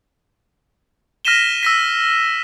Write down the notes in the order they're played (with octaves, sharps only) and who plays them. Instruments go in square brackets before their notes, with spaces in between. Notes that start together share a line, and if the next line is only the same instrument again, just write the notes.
[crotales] F6 A#6 B6 D#7 E7 G7
E6 A#6 B6